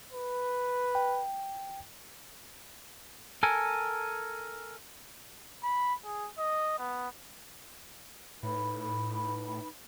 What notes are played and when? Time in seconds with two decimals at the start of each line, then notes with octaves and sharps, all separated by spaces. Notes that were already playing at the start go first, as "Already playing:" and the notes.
0.12 B4
0.95 G5
3.43 A4 A#4 G#5
5.64 B5
6.04 G#4
6.38 D#5
6.79 B3
8.43 A2 D#4 B4 B5